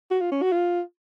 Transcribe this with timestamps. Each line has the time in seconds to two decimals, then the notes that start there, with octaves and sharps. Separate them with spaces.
0.11 F#4
0.21 F4
0.32 C#4
0.42 F#4
0.52 F4